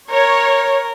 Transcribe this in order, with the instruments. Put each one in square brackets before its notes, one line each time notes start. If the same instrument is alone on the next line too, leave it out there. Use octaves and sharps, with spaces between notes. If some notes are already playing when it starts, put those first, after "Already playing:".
[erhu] A#4 [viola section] C#5